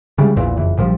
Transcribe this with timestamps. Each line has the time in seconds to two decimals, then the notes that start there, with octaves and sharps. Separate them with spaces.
0.18 C#3 E3 G3 G#3
0.36 A#1 E2 A#2 E3
0.56 F#1 F2 E3
0.77 A#1 A#2 F3 G3